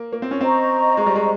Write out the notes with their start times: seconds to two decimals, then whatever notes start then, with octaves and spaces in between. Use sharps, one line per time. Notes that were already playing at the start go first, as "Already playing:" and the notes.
Already playing: A#3
0.12 A#3
0.22 C4
0.31 C#4
0.41 C4 C5 D#5 A#5 C#6
0.97 G#3
1.06 G3
1.16 G#3